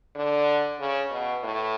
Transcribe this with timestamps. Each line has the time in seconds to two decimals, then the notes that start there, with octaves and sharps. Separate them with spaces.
0.16 D3
0.80 C#3
1.11 B2
1.43 A2